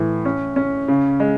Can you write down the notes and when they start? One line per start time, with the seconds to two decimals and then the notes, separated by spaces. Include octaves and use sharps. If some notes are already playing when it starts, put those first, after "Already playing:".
Already playing: A2 E3
0.25 C#4
0.56 C#4
0.88 C#3
1.20 G#3